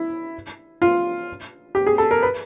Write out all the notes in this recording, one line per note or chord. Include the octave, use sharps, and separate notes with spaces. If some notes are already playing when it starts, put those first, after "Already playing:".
Already playing: E4
F4
G4
G#4
A4
A#4
B4